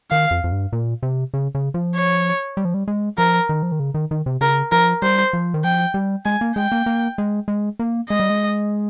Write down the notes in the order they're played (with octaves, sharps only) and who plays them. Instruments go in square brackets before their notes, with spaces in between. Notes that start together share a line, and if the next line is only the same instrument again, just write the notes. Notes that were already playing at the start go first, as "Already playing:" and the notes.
[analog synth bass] D#3 [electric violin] F5
[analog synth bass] F2
F2
G2
A#2
C3
C#3
C#3
F3
[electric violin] C#5
[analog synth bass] G3
F3
G3
G#3
[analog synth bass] F3 [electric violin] A#4
[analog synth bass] D#3
F3
D#3
C#3
D#3
D#3
C3
[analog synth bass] C#3 [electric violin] A#4
[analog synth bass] F3 [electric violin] A#4
[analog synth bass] G3 [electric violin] C5
[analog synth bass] F3
D#3
[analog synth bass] F3 [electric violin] G5
[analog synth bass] G3
[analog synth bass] G#3 [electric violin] G#5
[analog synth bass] A#3
[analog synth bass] G#3 [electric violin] G5
[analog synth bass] A#3
A#3
G#3
G#3
A#3
[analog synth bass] G#3 [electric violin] D#5
[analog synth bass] G3
G#3